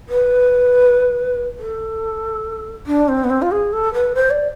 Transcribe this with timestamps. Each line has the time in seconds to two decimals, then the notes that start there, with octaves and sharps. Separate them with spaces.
0.09 B4
1.59 A4
2.87 D4
3.08 C4
3.24 B3
3.30 C4
3.42 F4
3.51 G#4
3.73 A4
3.94 B4
4.15 C5
4.31 D5